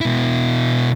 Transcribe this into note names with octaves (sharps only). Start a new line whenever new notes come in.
B2 E4